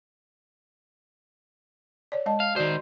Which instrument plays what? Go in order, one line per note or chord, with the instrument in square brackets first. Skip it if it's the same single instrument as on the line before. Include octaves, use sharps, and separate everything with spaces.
[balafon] C#5 D5
G#3 D#5 A5
[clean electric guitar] F5
[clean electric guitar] D#3 C5 [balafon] F#4 D5